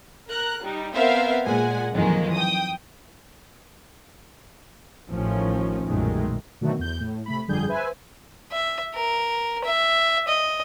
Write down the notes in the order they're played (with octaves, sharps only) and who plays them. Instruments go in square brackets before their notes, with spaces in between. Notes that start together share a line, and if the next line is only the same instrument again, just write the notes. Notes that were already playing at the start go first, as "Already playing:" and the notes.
[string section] A#4 A#5 F#6
G3 D#4
B3 C4 A#4 C5 E5 F5
A#2 G#3 F#5 G#5
F2 D#3 E3 F#3 G#3 A#3
G5 D#6
[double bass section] A1 A2 D#3 F3 C#4
B1 F#2 A#2 D#3 G#3 A3
[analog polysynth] B2 D3 D#3 F#3 A3 F#4
E2 G6
A2
C3 A3 B5
G1 F2 D3 G3 G#4 G6
B4 C5 E5 G#5
[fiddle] E5
A#4
E5
D#5